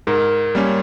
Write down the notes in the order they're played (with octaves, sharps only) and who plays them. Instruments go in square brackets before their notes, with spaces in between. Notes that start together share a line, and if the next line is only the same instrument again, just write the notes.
[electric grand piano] G#2 [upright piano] A#4
[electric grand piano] G3 A#3 C#4